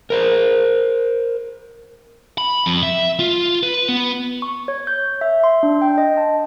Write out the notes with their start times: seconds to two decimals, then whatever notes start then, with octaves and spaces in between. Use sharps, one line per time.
0.10 A#4 C5
2.38 B5
2.66 F2
2.83 E5
3.20 F4
3.63 B4
3.89 B3
4.42 C#6
4.68 C#5
4.87 G6
5.21 E5
5.44 C6
5.63 D4
5.82 G5
5.98 D#5
6.17 A5